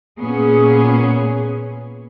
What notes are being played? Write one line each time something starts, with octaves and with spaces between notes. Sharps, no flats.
A#2 B3 C#4 G#4